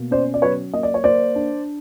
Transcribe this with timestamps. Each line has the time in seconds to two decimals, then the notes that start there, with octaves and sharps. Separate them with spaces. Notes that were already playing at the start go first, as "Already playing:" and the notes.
Already playing: B2 A#3
0.11 C#4 C5 D5
0.34 D5
0.42 F#3 B4 C#5
0.73 A#3 D#5
0.83 D5
0.94 C#5
1.04 A#3 C5 D5
1.35 D4